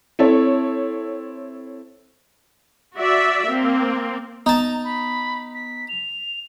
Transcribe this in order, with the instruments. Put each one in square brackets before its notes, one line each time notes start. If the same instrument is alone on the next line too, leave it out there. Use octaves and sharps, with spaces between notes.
[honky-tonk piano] C4 E4 A4 C#5
[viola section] F#4 D5 E5
A#3 C4
[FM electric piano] B3 [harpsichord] D#4 A5 [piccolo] A#5
[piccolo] B5
B6
F7